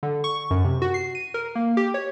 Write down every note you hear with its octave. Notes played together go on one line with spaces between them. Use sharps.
D3
C#6
F#2
C3
F#4
C7
D#7
A#4
A#3
G4
C#5